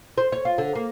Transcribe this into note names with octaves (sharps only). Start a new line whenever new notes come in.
C5
C#5
F4
D3
A#3